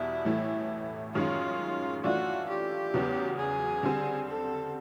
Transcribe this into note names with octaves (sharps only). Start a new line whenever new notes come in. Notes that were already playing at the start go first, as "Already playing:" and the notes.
Already playing: E2 B2 G3 E4
A2 E3 A3
F#2 D#3 G#3 C#4 F4
E3 A3 D4 F4 F#4
G4
E2 C#3 F#3 B3
G#4
D3 G3 C4
A4